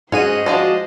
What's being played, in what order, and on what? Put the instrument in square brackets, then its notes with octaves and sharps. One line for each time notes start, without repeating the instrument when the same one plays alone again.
[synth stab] G#2 G#4 D#7 [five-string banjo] C#4 F#4 [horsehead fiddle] C5 D#5
[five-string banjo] F3 G#3 D4 [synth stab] F#4